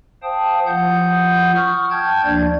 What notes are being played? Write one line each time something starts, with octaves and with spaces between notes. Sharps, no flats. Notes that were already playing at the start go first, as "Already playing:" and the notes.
C5 F5 G5 A5 D#6
F3 F4 F#5 D#6 G6
C#6 D#6 F6
G5 A5 G6 G#6
D2 F3 A#3 D4 D5 G#6